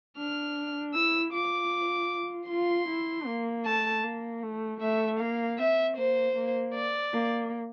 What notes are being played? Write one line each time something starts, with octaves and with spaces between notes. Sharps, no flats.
D4 F6
E4 E6
F4 D6
F4 C6
E4
A#3
A3 A5
A#3
A3
A3 E5
A#3 F5
C4 E5
A#3 C5
A#3
D5
A#3